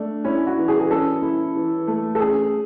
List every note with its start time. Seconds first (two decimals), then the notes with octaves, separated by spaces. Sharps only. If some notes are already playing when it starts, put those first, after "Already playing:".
Already playing: A3 D4
0.25 C#4 E4
0.47 F#4
0.57 E3
0.68 G#4
0.79 G#4
0.90 C#4 A4
1.22 E4
1.55 E3
1.87 A3
2.15 A4
2.20 C#4 G#4